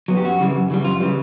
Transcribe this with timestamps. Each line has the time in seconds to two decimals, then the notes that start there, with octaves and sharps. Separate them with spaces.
0.08 F#3 B3
0.17 G4
0.25 F#2 F#4
0.40 C#3 E3 G3
0.55 F#2
0.70 C#3 E3 G3
0.84 F#2 F4
1.00 C#3 E3 G3